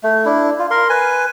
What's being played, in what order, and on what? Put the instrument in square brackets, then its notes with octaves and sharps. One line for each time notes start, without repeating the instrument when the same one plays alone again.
[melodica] A3
D4 E4
F4
A#4 C6
B4 G#5